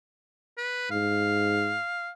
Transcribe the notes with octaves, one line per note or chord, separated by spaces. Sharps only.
B4
G#2 F5